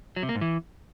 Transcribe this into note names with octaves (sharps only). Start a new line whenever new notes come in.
F#3
C3
A#3
G#2
E3